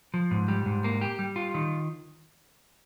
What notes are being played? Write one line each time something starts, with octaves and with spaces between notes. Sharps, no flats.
F3
G#2
G3
G#2
A#3
G4
G3
F4
D#3